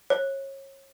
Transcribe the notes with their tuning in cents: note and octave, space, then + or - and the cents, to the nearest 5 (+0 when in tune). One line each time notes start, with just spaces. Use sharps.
C#5 -30